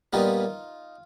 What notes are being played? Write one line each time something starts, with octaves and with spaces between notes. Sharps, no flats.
A#2 G3 B3 D#4 F4